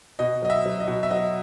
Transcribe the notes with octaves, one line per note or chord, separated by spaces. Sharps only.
B2 D#5
F#3 D#5
E5
F#3
D#5
B2
E5
F#3 D#5